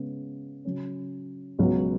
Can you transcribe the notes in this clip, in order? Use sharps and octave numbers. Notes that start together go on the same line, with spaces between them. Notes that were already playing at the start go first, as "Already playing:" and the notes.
Already playing: C#3 G#3 B3
C#3 F#3 C#4
C#2 B2 F#3 C#4 F#4